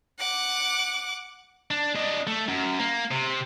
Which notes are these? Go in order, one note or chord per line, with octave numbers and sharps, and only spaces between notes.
F#5 D6
D4
D4 D#5
A3
F#2
A#3
C3